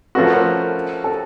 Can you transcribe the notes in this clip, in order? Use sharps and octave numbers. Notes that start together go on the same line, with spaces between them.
F3 A3 C#4 F#4 B4
A#4
A#4
A4